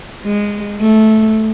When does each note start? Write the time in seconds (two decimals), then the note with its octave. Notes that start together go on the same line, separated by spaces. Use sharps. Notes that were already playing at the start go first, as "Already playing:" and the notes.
0.25 G#3
0.81 A3